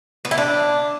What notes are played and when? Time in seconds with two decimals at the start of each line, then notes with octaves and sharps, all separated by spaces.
0.25 B3
0.31 E4
0.38 D4